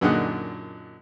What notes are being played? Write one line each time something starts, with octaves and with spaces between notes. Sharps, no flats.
F#2 A#2 D3 D#4 G#4 F#5